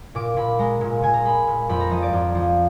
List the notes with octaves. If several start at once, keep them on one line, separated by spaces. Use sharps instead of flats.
A#2 D6
A#2 B5
G#3 A#5
A#2
A#2 G#5
A#5
G#3 B5
A#2
F2 B5
A#5
F3 D#5
D5
F2
F3